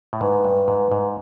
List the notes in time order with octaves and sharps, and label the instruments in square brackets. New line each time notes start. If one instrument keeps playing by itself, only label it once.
[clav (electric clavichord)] A2
[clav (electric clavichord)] G#2 [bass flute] B4
[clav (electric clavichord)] G2
G#2
G#2